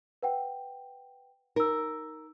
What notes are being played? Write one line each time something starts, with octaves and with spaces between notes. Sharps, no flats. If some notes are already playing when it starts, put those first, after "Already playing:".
B4 F#5 G5
D#4 A#4 E6